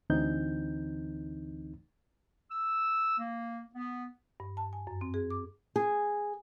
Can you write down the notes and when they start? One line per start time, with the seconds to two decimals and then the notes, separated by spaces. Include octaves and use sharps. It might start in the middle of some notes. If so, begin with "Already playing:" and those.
0.10 D2 D3 E3 C4 D#4 G6
2.50 E6
3.18 A#3
3.75 B3
4.40 G2
4.57 A5
4.73 G#5
4.87 F#2
5.01 C4
5.14 G#4
5.31 D6
5.76 G#4